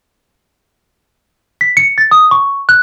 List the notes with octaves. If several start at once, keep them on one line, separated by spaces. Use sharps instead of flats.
B6
C#7
A6
D#6
C#6
F#6